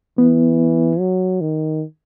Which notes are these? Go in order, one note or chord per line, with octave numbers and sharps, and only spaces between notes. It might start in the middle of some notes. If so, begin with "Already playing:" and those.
E3 B3
F#3
D#3